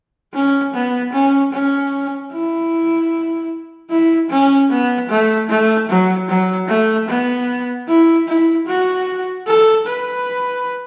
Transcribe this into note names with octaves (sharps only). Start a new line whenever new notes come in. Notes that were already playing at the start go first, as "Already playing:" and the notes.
C#4
B3
C#4
C#4
E4
E4
C#4
B3
A3
A3
F#3
F#3
A3
B3
E4
E4
F#4
A4
B4